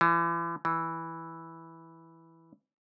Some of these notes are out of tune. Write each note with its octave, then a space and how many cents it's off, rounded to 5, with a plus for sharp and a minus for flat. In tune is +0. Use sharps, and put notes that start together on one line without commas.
E3 +35
E3 -5